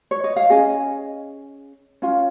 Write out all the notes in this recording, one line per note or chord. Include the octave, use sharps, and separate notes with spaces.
C#5
D#5
F5
C#4 G#4 D#5 G#5
C#4 F4